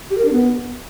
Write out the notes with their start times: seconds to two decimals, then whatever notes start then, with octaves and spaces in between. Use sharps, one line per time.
0.10 G4
0.18 A#4
0.25 D4
0.32 B3